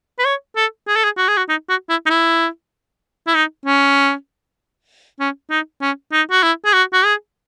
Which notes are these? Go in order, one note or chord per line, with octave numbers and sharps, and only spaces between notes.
B4
C#5
A4
G#4
A4
G#4
F#4
G#4
F#4
D#4
F#4
E4
D#4
E4
E4
D#4
C#4
C#4
D#4
C#4
D#4
F#4
E4
G#4
F#4
F#4
G#4